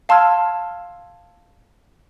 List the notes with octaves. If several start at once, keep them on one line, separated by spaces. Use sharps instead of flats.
F5 A5 C6 E6 F6 G#6